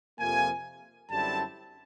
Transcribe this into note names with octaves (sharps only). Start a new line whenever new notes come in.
F2 C3 F3 A#3 G#5
F#2 D3 G3 C4 E4 A5